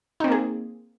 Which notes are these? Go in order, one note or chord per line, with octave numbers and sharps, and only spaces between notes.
A#3 C4 D#4 G#4